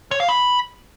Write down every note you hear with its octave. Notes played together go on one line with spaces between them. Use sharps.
C#5
F5
B5